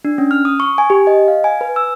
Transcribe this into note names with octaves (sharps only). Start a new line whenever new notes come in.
D4
C#4
F6
D#6
C#6
G#5
G4
D#5
F5
G#5
B4
E6